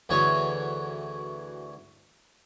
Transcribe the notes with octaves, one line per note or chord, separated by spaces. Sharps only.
D2 E3 F#4 G#4 C#5